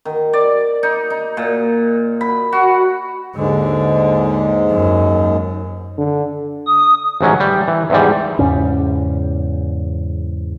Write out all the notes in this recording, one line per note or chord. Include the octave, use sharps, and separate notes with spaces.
D#3
D5
D#4
D#4
A#2
B5
F#4
D#2 G#2 D3 G#3
F#2
D3
D#6
A1 G#2 F#3 C#4
G3
E3
E2 G#2 G3
E2 G#2 C#3 C#4